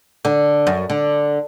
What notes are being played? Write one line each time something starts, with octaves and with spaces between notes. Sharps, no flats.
D3
F#2
D3